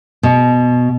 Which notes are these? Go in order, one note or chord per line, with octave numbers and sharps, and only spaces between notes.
B2